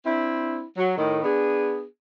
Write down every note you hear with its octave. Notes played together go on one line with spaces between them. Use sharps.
C4 D4 E4
F#3
A2 D#3
B3 D4 G#4